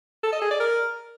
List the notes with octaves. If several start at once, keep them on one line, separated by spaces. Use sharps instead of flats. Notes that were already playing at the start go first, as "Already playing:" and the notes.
A4
D#5
G#4
D5
A#4